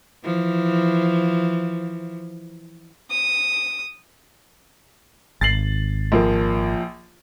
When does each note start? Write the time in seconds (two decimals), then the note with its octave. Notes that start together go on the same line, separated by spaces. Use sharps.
0.24 E3 F3
3.11 D#6
5.41 G#1 A6 C7 F#7
6.12 A#1 F3 A#3